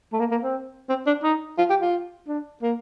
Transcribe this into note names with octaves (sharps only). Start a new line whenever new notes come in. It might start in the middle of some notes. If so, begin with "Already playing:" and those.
A3
A#3
A#3
C4
C4
D4
D#4
F4
G4
F4
D4
A#3